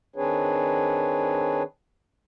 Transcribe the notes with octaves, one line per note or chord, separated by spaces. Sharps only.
D#3 C4 D4 G#4 B4 C#5